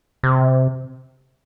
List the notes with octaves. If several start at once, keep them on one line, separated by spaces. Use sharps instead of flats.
C3